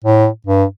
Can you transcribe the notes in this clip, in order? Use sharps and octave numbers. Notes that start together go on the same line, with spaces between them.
A2
G2